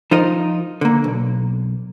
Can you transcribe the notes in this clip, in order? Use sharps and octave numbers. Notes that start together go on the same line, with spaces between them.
F3 D#4 F4 A#4 D#5
D3 A#3
B1